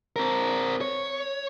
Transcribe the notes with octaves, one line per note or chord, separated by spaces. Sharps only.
C4 A#4
C#5